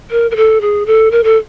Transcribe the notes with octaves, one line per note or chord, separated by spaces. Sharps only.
A#4
A#4
A4
G#4
A4
A#4
A4